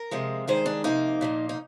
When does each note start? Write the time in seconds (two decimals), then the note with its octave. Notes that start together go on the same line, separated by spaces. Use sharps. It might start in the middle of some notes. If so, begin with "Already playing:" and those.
Already playing: A#4
0.11 C3 F3 G#3
0.48 G2 D#3 G#3 C5
0.66 D4
0.84 C3 F3 A#3 D#4
1.21 A#2 F3 A#3
1.49 D#4